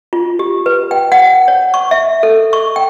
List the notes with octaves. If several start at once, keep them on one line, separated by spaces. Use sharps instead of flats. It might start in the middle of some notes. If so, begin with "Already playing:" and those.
F4
G4
B4
G5
F#5
C#5
C#6
E5
A4
C#6
G5